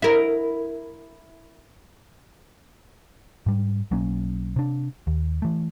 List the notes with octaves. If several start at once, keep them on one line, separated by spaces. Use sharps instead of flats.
E4 A#4
G#2 G3
B1 F#3 A#3 C#4
C3 D4
D#2
E3 A3